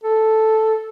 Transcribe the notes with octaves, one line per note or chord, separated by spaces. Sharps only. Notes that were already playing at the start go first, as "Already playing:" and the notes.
A4